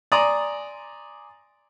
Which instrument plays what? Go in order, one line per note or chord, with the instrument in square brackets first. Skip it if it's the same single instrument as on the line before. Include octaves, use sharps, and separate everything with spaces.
[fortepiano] D5 G#5 A#5 C6 D#6